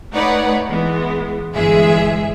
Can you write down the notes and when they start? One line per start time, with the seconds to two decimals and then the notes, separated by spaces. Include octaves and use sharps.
0.13 A3 D#4 B4 C#5 D5 F#5
0.69 E3 G#3 B3
1.55 G1 E3 G#3 G#4 E5